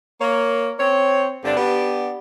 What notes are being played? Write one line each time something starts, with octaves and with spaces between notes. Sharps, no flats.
A#3 C#5
C4 C#5
G2 D3 C4 D4
B3 D4 G4